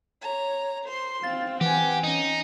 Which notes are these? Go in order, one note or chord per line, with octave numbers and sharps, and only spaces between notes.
C#5 A#5
C5 C6
C4 F5 A6
E3 G4 F#5 G#5
C#4 D#4